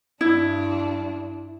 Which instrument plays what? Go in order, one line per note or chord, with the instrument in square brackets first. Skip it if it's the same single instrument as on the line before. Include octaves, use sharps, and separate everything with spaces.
[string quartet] G2 D4 [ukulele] E4